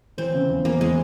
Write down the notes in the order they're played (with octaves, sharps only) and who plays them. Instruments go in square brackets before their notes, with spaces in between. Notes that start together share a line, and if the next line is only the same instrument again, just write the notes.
[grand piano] E3 [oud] C4
[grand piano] C#3
E2
[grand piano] E2 [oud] A#3
[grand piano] E3 [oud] G#3